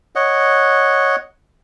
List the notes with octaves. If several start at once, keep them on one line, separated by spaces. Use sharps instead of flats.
C#5 D#5 F#5